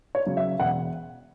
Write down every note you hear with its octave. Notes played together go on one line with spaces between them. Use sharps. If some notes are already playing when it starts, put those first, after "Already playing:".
C#5
C#3 F#3
E5
E1 F#5